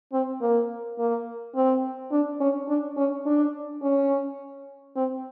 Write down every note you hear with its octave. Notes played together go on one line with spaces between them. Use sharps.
C4
A#3
A#3
C4
D4
C#4
D4
C#4
D4
C#4
C4